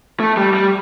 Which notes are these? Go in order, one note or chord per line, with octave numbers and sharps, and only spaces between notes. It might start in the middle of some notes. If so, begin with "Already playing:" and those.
A3
G3
G3